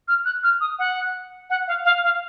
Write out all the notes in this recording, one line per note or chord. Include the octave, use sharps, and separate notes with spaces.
F6
F#6
F6
D#6
F#5
F#5
F5
F5
F5